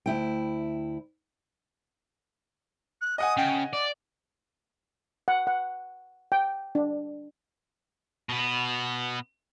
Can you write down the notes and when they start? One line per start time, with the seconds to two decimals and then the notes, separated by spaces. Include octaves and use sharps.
0.06 D2 E4 G5
3.01 F#6
3.18 D#5 F#5 G#5 D#6
3.37 C#3 G5
3.73 D5 D6
5.28 F#5
5.47 F#5
6.32 G5
6.75 D4
8.29 B2 B3